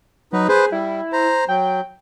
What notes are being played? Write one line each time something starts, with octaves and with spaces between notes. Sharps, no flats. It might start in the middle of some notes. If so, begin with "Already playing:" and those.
F#3 D#4 B4
G#4 B4 C5
G3 E4
C5 A#5
F#3 G5